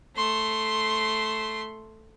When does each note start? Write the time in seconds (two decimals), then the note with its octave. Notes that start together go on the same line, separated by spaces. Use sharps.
0.17 A3 C6